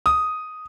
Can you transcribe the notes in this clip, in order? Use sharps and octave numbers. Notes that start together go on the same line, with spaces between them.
D#6